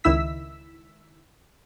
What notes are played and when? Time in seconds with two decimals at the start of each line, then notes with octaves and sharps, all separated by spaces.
0.04 C#2 D#3 E4 E6 B6